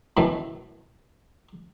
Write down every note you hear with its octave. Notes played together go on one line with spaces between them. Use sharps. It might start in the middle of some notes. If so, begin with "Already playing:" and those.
F#2 B2 D#3 E3 F#3 A3